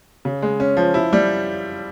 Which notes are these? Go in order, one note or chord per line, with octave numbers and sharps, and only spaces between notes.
C#3
G#3
C#4
F3
E4
G3